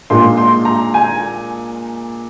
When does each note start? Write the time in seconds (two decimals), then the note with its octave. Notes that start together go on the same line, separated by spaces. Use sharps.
0.10 A#2 G#3 D4 C6
0.37 C6
0.65 A#5
0.94 G#5